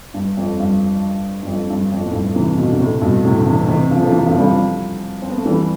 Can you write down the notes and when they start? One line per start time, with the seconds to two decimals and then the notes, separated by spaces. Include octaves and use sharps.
0.14 G2
0.37 F2
0.59 G2
1.42 G2
1.47 F2
1.70 G2
1.92 F2
2.05 A2
2.13 G2
2.35 C3 E3
2.58 B2 D3
2.71 D3
2.79 A2 C3
3.01 G2 B2
3.25 A2 C3
3.37 D3
3.46 C3 E3
3.68 C3 E3
3.90 D3 F3
4.02 F3
4.12 C3 E3
4.27 D3 F3
4.37 G3
4.41 D3 F3
5.22 C4
5.30 B3
5.37 A3
5.45 E3 G3